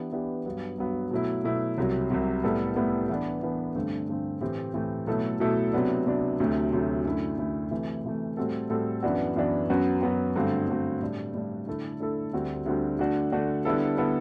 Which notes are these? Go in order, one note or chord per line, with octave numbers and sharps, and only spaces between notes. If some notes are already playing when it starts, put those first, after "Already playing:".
Already playing: E3 B3 D4 G4
E3 B3 D4 G4
G2 F#3 B3
G2 F#3 B3
B2 F#3 A3 E4
B2 F#3 A3 E4
C2 C3 F#3
C2 C3 F#3
A2 G3 B3 E4 A4
A2 G3 B3 E4 A4
E3 B3 D4
E3 B3 D4
G2 D3 A3 C4
G2 D3 A3 C4
A2 E3 A3 C4 G4
A2 E3 A3 C4 G4
B2 F#3 A3 E4 A4
B2 F#3 A3 E4 A4
C3 F#3 B3 D4
C3 F#3 B3 D4
D2 C3 F#3 A3
D2 C3 F#3 A3
F#2 D3 A3 E4
F#2 D3 A3 E4
C3 E3 A3
C3 E3 A3
A2 G3 C4 F#4 A4
A2 G3 C4 F#4 A4
F#2 E3 B3 D4 F#4
F#2 E3 B3 D4 F#4
F#2 F#3 B3 F#4
F#2 F#3 B3 F#4
G2 D3 A3 C4 F#4
G2 D3 A3 C4 F#4
A2 G3 D4
A2 G3 D4
D3 A3 E4 A4
D3 A3 E4 A4
D2 D3 G3 C4 F#4
D2 D3 G3 C4 F#4
D3 A3 D4 F#4
D3 A3 D4 F#4
D3 G3 B3 E4 A4
D3 G3 B3 E4 A4